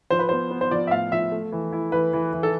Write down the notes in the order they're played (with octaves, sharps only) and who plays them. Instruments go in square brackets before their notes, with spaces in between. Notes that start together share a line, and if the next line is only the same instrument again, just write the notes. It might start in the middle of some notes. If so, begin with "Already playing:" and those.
[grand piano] F3 [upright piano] C5
[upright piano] B4
[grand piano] B3 [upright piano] C5
[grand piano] B3
[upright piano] C5
[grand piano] F3 [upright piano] D5
[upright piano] E5
[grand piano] A2 [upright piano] F5
[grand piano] F3 [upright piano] E5
[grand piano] A3
E3
E4
[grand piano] E3 [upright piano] B4
[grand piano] E3
E3
[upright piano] A4